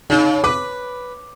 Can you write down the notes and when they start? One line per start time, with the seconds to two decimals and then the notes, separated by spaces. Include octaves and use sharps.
0.10 C#3 D#4
0.44 B4 D6